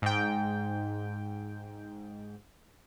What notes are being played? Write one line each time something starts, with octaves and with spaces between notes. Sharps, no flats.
G#2 G5